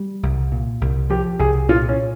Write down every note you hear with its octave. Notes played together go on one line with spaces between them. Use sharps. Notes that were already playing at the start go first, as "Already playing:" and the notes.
Already playing: G3
C2
A#2
C2
F3 G4
C2 G#4
A#2 F4
C#4